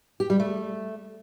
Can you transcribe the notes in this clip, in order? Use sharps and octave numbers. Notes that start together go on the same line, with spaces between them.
G4
G3
A3